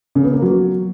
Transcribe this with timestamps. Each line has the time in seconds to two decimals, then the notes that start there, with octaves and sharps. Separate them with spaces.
0.15 C#3
0.24 B3
0.33 A#3
0.42 F#3